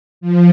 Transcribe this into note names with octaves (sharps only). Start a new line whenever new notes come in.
F3